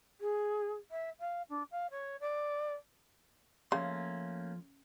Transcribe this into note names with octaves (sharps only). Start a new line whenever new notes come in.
G#4
E5
F5
D4
F5
C#5
D5
C#3 F3 A3 A#3 C#4 C6